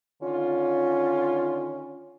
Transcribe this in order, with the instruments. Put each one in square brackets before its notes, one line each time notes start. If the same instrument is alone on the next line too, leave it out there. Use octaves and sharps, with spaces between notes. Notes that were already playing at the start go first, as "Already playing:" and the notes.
[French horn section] D3 D#3 F4 [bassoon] C#4